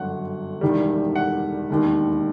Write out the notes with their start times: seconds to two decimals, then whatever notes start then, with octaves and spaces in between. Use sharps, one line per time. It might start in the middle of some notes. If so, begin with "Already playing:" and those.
Already playing: G1 F#2 F#3 F#5
0.61 E1 E2 D#3 G3
1.16 F#5
1.70 E1 D#2 D#3